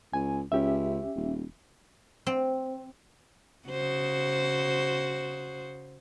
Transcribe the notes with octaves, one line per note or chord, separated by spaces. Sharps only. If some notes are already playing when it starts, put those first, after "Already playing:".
C#2 G#5
C#2 C#4 G4 E5
D#1
C4
C#3 F#4 C5